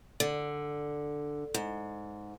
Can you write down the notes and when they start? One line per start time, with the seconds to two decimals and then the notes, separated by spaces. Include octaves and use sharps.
0.20 D3
1.54 G#2